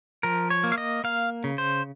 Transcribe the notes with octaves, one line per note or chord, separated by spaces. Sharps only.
F3 A#4
C#5
A#3
F5
D#5
A#3 F5
C#3
C5